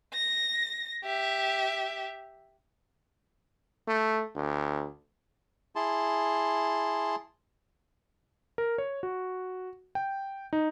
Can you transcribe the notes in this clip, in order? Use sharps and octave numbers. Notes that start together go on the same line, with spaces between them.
A#6
G4 E5
A3
D2
E4 G#4 A5 C6
A#4
C#5
F#4
G5
D#4